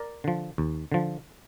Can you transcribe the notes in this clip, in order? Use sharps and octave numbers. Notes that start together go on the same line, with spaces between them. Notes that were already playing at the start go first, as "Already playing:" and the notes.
Already playing: A#4 D5
D3 F3
D#2
D3 F3